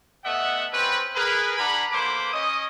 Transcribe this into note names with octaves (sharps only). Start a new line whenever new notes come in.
A3 B3 D#5 E5 F#5
C4 C#4 G4 B4
G#4 A#4 B4
D4 F#5 G#5 A#5 B5
A#3 A4 B4 C5 B5 D6
C#4 D#5 D#6